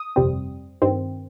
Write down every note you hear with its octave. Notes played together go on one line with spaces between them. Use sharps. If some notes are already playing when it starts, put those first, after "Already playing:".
Already playing: D#6
G1 F2 C3 G3 C4
G2 D#3 C4